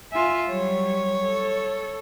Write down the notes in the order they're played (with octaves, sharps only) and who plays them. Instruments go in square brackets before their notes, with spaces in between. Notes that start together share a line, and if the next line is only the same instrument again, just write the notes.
[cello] F4 E5 [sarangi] G#5
[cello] F#3 G3 [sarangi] C#5
[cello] A4